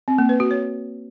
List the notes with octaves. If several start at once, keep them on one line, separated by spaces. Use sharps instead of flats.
C4
A#3
B4
F#4
C#5